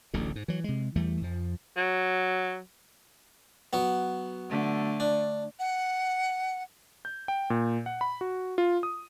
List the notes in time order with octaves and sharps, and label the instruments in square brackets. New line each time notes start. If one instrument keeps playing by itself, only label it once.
[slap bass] D1 A1 D2 D3
G#2
E3 F#3
C3 G#3
E2 E3 G3 A3
F2 F3
[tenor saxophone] F#3
[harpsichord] F#3 B3
[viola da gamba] D3 A3
[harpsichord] D4
[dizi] F#5
[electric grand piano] G6
G5
A#2
F#5
B5
F#4
F4
D#6